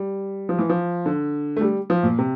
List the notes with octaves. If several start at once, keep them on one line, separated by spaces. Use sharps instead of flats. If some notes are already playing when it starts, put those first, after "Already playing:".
Already playing: G3
F3
E3
F3
D3
A3
G3
F3
A#2
C3